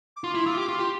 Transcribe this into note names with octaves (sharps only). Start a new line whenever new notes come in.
D6
F4 C6
E4
F4 E6
D6
G4
F4 C6
G4